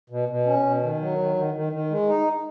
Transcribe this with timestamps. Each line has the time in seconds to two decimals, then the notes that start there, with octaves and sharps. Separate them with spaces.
0.10 B2
0.29 B2
0.46 C#4
0.64 B2
0.83 D#3
1.00 F#3
1.18 D#3
1.36 D#3
1.54 D#3
1.73 D#3
1.90 G#3
2.08 D#4